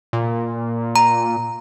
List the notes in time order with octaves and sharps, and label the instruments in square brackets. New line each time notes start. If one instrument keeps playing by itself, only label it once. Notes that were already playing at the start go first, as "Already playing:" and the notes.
[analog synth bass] A#2
[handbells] A#5